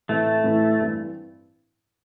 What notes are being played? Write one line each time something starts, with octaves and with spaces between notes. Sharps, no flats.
A2 E3 A3 C4 E4
A2 E3 C4 E4
G2 E3 G3 C4 E4